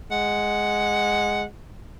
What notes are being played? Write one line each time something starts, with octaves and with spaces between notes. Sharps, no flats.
G#3 F#5